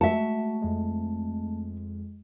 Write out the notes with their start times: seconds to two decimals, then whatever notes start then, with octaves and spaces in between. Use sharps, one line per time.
0.01 G#3 A3 F#4 E5 A5
0.62 F2 G#3